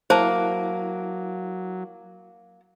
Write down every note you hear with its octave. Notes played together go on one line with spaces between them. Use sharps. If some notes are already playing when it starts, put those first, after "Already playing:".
F#3 A#3 E4 C5 A5